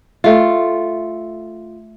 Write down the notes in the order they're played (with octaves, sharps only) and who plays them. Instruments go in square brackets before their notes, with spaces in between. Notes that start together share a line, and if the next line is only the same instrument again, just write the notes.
[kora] A3 F4